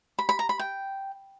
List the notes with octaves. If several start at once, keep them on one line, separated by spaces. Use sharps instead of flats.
B5
B5
A#5
B5
G5